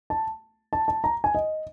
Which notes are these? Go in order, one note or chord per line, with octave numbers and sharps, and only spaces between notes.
A5
A5
A5
A#5
G#5
D#5